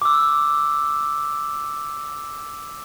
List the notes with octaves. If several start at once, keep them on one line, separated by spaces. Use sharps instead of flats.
D6 E6